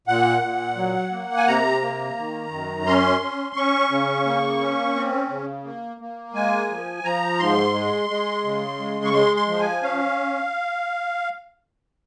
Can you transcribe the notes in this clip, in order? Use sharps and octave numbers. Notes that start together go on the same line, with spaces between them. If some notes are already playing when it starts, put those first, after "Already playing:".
A#2 F#5
A#2
F#3
A#3
G#5
C3 A#5
A#3
D#3
F#2
C#4 C6
C#4
C#4 C#6
C#3
A#3
C#4
C4
C#3
A#3
A#3
G#3 G#5
F3
F3 A#5
G#2 C6
G#3
G#3
C#3
G#3
C#6
G#3 C6
C6
F3
G#5
C#4 F5